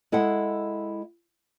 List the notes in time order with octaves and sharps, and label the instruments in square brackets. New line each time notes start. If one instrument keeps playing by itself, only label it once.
[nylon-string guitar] G#3 E4 A4 E5 F#5